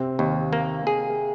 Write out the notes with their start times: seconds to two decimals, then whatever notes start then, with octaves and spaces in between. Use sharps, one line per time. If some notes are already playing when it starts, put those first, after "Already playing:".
Already playing: C3 C4
0.19 D#2
0.53 A#3
0.87 G#4